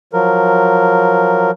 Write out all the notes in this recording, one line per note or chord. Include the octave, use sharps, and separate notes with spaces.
F3 F#3 A#4